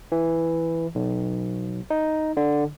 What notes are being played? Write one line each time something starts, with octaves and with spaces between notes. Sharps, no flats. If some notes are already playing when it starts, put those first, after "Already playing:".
E3
B1
D#4
D3